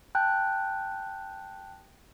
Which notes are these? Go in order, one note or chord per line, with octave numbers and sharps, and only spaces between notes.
G5 A5 F#6 G6